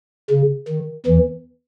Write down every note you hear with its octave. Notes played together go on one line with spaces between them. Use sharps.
C#3
D#3
E2 E3